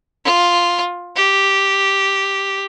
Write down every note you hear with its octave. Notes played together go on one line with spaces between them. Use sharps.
F4
G4